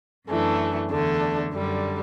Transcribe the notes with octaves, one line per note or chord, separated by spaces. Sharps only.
F#2 E3 A3 D4
E2 D3 A3 D4
F#2 D3 G3